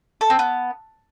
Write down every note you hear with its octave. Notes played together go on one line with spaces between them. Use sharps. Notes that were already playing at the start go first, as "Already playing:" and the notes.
A4
C4
B3